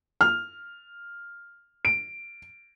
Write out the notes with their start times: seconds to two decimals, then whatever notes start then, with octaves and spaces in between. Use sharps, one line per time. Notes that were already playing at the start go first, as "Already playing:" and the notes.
0.21 F6
1.85 D7